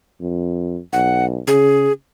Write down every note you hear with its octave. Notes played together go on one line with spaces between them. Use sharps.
F2
B1 F#5
C#3 G#4